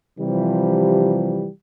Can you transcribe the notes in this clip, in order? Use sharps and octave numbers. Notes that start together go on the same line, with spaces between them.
C3 E3 F3 G3